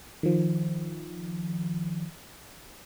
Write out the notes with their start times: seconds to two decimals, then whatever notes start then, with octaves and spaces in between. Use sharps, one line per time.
0.23 D#3 F3